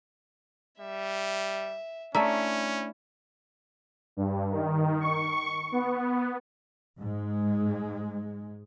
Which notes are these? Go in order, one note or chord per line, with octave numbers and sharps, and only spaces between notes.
G3 E5
A3 C#4 D4 E4 D5 E5 A#5
G2
D#3
C#6
B3
G#2 G#3